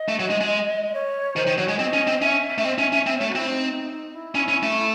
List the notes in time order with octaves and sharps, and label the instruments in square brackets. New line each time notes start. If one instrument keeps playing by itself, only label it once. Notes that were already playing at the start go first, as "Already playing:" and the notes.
Already playing: [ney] D#5
[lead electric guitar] A3
F#3
G#3
G#3
[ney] C#5
[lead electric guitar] D#3 [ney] C5
[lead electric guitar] D#3
[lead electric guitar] F#3 [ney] C#5
[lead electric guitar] G#3
[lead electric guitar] C4 [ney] D#5
[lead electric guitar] C#4
C4
[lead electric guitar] C#4 [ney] E5
[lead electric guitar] A3
[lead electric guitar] C4 [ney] D#5
[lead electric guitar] C#4 [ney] E5
[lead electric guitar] C#4 [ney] E5
[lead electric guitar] C4 [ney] E5
[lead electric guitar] A3 [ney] C#5
[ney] F#4
[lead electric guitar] C4 [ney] E4
[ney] D#4
D#4
E4
[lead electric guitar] C#4
C#4
A3